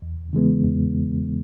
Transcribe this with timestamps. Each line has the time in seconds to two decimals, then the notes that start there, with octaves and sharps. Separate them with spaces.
0.02 E2
0.33 C#3 E3 G#3 B3
0.64 E2